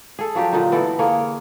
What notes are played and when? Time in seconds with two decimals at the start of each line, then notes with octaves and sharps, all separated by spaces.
0.19 G#4 A4
0.35 F3 F#3 D4 G4
0.53 A#2 D3 D#4
0.72 E3 B3 A4 D5
0.99 D3 A#3 G#4 C#5